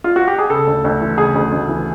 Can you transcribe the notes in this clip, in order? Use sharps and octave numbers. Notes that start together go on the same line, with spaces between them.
F4
F#4
G4
G#4
C#3 A4
D2
D2
E3
C#3 G#4
D2
D2
E3